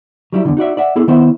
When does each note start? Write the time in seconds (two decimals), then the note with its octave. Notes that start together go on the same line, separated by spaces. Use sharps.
0.33 F#3 G3 E4
0.45 E2 G2 D3
0.57 D#4 F#4 D5 E5
0.77 D5 E5 F#5
0.96 B3 E4 G#4 A4
1.08 D#3 B3 E4 C5 E5